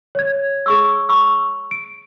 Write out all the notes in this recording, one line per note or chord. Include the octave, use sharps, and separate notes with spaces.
C#5 G#6
G#4 C#6 E6
B5 C#6 E6
D7